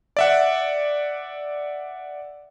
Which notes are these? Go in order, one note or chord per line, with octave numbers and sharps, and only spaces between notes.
D5 E5 F#5